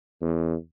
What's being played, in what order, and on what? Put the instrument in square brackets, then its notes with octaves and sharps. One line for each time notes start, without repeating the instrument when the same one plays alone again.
[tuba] E2